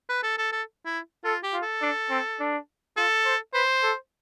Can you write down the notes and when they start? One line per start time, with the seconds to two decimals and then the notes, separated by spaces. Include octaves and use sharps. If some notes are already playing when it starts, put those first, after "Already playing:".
0.09 B4
0.23 A4
0.38 A4
0.52 A4
0.85 E4
1.25 F4 A4
1.43 G4
1.53 F4
1.63 A4
1.82 D4
2.10 C4
2.40 D4
2.97 F4 A4
3.25 C5
3.54 B4 C5
3.83 A4